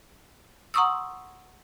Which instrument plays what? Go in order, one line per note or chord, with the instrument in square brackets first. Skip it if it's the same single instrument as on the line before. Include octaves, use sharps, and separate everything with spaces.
[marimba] F#5 A#5 C6 C#6 D#6 E6